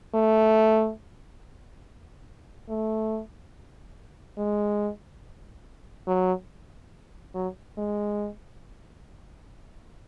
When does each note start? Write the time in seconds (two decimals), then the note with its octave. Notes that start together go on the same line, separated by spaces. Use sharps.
0.15 A3
2.69 A3
4.38 G#3
6.07 F#3
7.35 F#3
7.78 G#3